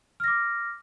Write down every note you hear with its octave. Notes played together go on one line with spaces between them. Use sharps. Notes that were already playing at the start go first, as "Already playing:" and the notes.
D6 F6 A#6